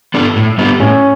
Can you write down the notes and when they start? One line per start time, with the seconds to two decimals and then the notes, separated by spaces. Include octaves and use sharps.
0.14 B3 D4 A4
0.36 A2
0.58 G3 B3 D4 G4
0.80 A2 C#4